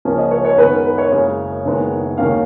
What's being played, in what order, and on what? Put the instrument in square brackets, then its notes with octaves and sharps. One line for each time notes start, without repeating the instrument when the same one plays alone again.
[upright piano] C#2 C#3 F3 A#3 C#4
D#5
C#5
C#5
F#2 D#3 G#3 B3 B4
A#4
B4
C#5
F#1 F#2 C#3 G#3
F#1 F#2 D#3 G#3 B3
D#2 D#3 A#3 C#4 F5